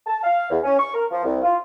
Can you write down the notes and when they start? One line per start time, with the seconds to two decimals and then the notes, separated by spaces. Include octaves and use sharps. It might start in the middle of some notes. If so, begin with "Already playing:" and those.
0.07 A5
0.24 F5
0.51 E2
0.63 C#4
0.78 C#6
0.94 A#4
1.11 F3
1.24 C2
1.43 F4